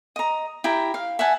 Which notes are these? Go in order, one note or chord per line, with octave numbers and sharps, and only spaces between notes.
D#5 A#5
E4 G4 G5 A#5
F5
E5 F#5 G#5 A5